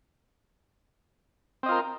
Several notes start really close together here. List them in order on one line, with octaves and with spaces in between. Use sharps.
C4 D#5 F4 A#4